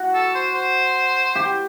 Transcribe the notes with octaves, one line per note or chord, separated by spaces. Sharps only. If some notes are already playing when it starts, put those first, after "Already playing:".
Already playing: F#4
A4
C5
C5
G4